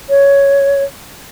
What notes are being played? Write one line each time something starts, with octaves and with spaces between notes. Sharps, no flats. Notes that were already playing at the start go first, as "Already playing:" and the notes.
C#5